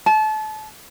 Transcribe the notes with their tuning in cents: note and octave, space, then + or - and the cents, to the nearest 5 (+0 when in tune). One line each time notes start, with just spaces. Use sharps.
A5 -30